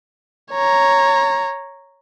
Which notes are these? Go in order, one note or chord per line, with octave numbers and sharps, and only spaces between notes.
C#5 A#5